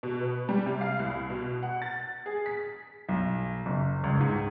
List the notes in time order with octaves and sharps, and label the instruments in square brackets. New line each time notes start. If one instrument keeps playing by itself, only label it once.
[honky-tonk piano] B2
B4
G3
C3
F5
C2
B2
F#5
A6
G#4
B6
[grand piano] B1
F#1
C#2
G#2